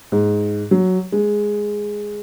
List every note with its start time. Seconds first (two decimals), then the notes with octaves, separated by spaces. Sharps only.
0.12 G#2
0.71 F#3
1.12 G#3